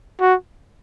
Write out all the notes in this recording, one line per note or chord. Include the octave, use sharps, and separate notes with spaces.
F#4